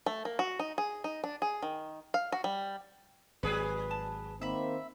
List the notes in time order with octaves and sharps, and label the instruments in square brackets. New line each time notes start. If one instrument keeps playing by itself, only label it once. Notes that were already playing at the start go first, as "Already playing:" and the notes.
[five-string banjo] A3
A#3
F#4
D#4
G#4
D#4
D4
G#4
D#3
F5
F#4
G3
[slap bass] G#1 [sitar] F#3 G#4 B4 [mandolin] C#5 F#6
[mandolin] A5
[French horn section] D#3 A#3 C4 [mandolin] E5 B5